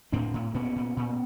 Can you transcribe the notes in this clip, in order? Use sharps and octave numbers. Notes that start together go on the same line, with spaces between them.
A2 C4 D4
A2
A#2 B3 C#4
A#2
A#2